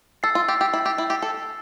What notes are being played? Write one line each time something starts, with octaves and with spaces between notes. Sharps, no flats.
A4 E6 A6 C7
F4
G4
G4
E4
G4
E4
G4
A4